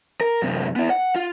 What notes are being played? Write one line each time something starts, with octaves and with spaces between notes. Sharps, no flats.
A#4
F#2 C3
B3 E4
F#5
F4